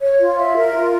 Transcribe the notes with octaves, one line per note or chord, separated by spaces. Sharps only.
C#5
F4
E5
A#4
F4